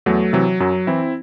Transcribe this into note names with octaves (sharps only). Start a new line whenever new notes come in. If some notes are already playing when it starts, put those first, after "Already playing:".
E2 F#3 A3
C3 E3 F#3
F#2 F#3
E3 C4 E4